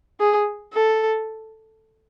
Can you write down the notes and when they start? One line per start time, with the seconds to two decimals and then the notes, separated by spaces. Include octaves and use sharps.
0.20 G#4
0.74 A4